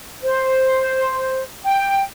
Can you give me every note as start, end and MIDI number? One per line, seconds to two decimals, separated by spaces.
0.22 1.41 72
1.64 1.99 79